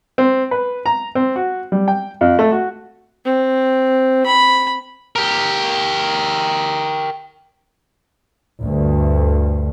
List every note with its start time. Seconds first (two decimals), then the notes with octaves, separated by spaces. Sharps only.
0.18 C4
0.51 B4
0.86 A#5
1.15 C4
1.36 F#4
1.72 G3
1.88 G5
2.21 F2
2.39 A3
2.52 F#4
3.25 C4
4.26 B5
5.16 G4 A#4
8.63 D2 G2